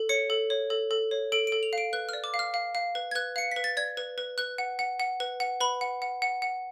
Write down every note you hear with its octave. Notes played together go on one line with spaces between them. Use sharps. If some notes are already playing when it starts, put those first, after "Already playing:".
Already playing: A4
C#5 C#7
A4
C#5
A4
A4
C#5
A4 D7
A4 D7
F7
F5 D7
B4 F#6
D5 F6
D6
F5
F6
F5
F5
B4
G#6
B4 F#6
F5 C#7
B4 B6
A6
D5 G#6
B4
B4
B4 F#6
F#5
F#5
F#5
B4
F#5
B4 B5
F#5
F#5
F#5
F#5